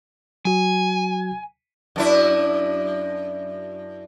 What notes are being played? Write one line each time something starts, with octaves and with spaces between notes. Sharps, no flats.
F#3 F#4 G#5
F#2 D4 E4